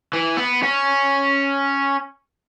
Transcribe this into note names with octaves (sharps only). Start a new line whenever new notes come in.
E3
B3
C#4